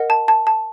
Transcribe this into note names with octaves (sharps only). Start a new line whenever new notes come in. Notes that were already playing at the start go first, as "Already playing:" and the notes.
Already playing: A#4 D#5 F#5
A5
A5
A5